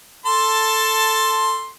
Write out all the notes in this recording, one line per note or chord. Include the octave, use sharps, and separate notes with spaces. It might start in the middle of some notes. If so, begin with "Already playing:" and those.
A4 A5 C6